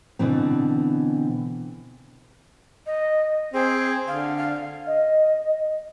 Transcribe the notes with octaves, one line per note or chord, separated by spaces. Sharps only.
B2 D3 E3 C4
D#5
C4 G#4
D3 F5
F5
D#5